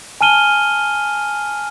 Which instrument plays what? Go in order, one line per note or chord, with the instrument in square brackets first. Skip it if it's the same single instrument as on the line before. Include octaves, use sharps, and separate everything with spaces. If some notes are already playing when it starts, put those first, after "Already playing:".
[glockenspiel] G#5 A5 F6 D#7 G7